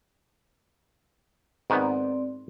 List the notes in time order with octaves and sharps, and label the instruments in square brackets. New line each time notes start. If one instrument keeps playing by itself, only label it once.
[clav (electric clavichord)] G#2 D#3 B3 [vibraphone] C4 D5